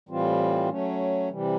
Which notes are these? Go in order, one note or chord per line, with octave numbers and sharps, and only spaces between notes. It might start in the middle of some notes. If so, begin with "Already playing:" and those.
A2 E3 G3 C4 F4
F#3 A3 C#4
C3 E3 G3